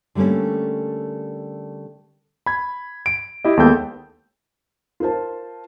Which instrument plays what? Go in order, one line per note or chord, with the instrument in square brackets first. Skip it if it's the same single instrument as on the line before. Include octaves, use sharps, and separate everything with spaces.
[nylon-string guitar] D3 G3 A3 A#3 C#4
[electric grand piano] B5 G#6
D7
E4 G4 D#5
D#2 G#3 B3 A4 G5 G6
[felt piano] F4 A#4 C5 A5